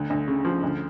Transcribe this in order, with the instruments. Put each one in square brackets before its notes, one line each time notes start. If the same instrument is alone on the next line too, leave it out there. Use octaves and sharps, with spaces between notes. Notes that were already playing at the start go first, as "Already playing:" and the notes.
Already playing: [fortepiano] D2
D2
C#3
F3
D2